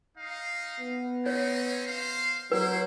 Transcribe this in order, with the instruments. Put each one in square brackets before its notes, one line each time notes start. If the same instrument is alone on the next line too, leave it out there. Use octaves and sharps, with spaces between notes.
[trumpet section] D#4 F5
[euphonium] B3
[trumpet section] C4 C#4 D#4 [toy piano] C#5
[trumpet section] C5 F5
[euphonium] F#3 [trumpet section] E4 C5 [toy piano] B4